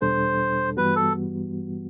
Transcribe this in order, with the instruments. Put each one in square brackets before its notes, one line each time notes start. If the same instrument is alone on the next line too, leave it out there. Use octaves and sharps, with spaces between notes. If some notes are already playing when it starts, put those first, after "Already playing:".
[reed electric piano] E2 B2 G3 D4 A4 [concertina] C5
[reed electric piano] G2 E3 G3 B3 F#4 [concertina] B4
[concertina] A4